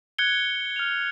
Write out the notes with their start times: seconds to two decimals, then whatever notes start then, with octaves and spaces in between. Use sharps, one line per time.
0.18 F#6 G#6 C#7 G7
0.76 F6 F7